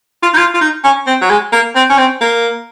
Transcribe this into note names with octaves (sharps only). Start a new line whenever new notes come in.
F4
D#4
F4
F4
D#4
C#4
C4
F#3
G#3
A#3
C4
C#4
C4
A#3